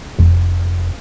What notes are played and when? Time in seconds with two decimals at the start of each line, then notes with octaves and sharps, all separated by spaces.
0.19 F1